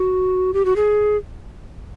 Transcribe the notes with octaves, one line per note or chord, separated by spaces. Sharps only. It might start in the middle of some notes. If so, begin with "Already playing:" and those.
Already playing: F#4
G4
F#4
G#4